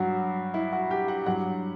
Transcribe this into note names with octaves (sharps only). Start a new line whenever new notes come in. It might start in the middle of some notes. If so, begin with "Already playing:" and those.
Already playing: G2 F#3 F#4
E4
F#4
G4
F#5
G2 F#3 F#5